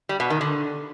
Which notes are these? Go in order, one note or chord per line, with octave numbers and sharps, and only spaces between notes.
G3
B2
D#3
D3